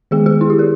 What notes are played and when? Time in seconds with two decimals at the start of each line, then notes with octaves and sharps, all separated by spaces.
0.11 D#3 G#3 B3 G#4
0.26 G#4
0.41 E4
0.50 G4
0.59 A#4